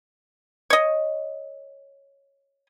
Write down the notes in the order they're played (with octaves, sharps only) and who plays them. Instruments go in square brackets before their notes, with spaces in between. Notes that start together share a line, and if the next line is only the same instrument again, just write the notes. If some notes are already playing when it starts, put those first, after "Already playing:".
[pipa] C#5 D#5